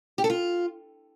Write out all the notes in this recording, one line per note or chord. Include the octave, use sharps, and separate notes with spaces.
G4
A4
F4